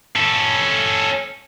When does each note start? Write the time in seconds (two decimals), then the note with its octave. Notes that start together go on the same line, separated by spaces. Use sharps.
0.16 C#4 A4